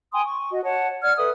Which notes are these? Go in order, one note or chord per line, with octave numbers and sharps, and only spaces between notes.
G5 G#5 C6 D#6
C#6
F#4 D#5
C#5 F#5 A5
D5 F#5 F6 G#6
A4 B4 E5 D#6